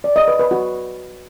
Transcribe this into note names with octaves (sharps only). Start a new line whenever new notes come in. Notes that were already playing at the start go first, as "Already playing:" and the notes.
D5
D#5
B4
B4
F#4